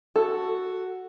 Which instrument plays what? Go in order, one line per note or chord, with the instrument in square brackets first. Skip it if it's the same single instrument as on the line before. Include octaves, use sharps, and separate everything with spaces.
[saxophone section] F#4 [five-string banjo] A4